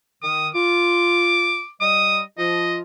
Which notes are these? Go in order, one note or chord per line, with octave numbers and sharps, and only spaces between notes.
D#3 D#6
F4 D6
G3 D#5 D#6
F3 F4 D#5